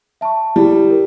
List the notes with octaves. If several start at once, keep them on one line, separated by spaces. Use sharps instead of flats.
E5 A5 C#6
G3 E4
A#4